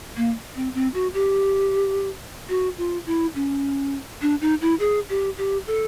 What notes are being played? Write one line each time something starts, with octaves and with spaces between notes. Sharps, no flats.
A#3
C4
C4
F#4
G4
F#4
F4
E4
C#4
D4
D#4
E4
G#4
G4
G4
A4